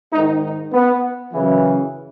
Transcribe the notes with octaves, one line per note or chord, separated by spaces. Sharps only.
G#2 D#3 D#4
D#4
B3
F#2 C#3 E3